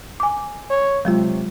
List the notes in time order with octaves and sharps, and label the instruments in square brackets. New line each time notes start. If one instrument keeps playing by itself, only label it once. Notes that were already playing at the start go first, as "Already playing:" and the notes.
[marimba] G#5 D6
[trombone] C#5
[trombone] C3 [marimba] F#3 G#3 F4